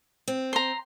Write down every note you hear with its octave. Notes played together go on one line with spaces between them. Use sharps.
C4
A#5 C6